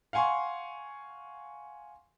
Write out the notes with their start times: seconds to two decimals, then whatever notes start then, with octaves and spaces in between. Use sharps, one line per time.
0.13 F5 F#5 G#5 C6 C#6